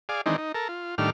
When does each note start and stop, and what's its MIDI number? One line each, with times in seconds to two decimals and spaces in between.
0.09 0.21 68
0.09 0.21 74
0.09 0.21 77
0.26 0.36 51
0.26 0.36 52
0.26 0.36 56
0.26 0.36 60
0.26 0.36 62
0.26 0.36 63
0.38 0.52 63
0.55 0.68 69
0.55 0.68 70
0.69 0.95 65
0.98 1.10 45
0.98 1.10 51
0.98 1.10 55
0.98 1.10 62
0.98 1.10 89